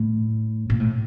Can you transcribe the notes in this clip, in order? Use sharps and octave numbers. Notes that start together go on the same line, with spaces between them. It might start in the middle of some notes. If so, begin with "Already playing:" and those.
Already playing: A2
A#2
A2